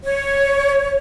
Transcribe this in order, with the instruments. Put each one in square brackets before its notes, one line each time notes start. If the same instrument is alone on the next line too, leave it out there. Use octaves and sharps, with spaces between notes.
[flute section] C#5